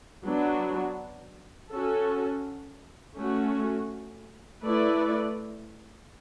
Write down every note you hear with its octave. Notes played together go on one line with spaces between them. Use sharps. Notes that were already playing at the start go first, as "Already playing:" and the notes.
F#3 B3 D4 F#4
C#4 F#4 A4
A3 C#4 F#4
A3 E4 B4 D5